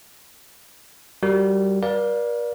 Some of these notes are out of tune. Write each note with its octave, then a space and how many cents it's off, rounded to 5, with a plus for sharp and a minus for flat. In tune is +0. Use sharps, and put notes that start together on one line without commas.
G3 -15 F#4 +0 A#4 -20
A#4 +45 D5 +0 F5 +0